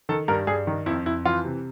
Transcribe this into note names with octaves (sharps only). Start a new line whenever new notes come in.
D#3 A4
G2 A#4
G2 G#4
D#3
F2 E4
F2 E4
E3 F4
C3